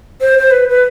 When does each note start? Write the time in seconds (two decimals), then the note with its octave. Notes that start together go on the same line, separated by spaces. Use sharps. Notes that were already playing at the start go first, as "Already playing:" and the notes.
0.21 C5
0.38 C5
0.51 B4
0.69 B4